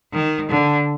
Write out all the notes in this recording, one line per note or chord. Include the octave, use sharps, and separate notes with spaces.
D#3
D3